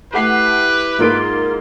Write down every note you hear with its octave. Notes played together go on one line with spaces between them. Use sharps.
A3 E4 G4 B4 F#5 C7
G#2 A#3 F4 D7